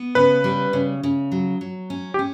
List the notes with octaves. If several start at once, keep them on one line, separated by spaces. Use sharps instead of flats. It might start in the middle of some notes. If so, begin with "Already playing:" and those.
Already playing: B3
C#3 B4
G3
C#3
C#3
F#3
F#3
C#4
G4
C#4